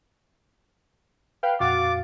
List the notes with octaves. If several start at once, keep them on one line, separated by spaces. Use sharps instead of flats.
B4 F5 G5
F2 A#2 F#4 F5 D6 A6